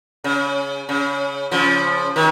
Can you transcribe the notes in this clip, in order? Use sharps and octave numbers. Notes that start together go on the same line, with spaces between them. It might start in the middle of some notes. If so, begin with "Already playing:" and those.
C#3
C#3
C#3 F3
D#3